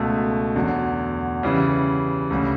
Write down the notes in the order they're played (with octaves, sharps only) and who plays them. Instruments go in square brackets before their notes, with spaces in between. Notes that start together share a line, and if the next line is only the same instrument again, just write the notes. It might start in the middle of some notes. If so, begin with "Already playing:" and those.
Already playing: [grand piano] C#2 B2 A3
E2 D3 F#3
C#3 E3 G3
D2 C#3 G3